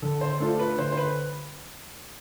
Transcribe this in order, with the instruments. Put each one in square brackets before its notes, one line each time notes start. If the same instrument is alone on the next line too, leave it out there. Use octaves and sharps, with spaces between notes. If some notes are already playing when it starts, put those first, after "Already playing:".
[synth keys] D3 [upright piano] A4
[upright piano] C5
[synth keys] A3 D4 F4 [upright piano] A4
[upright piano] B4
[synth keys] D3 [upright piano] C5
[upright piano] C5
B4